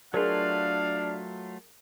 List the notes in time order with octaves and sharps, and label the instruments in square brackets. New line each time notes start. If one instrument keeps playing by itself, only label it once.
[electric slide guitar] F#3 A3 F4 [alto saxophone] D4 [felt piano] G#4 A#4 [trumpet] F5